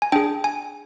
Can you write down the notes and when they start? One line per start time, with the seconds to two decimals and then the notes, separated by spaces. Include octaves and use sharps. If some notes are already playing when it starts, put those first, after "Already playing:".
0.02 G#5
0.12 D4 G#4 G5
0.44 G#5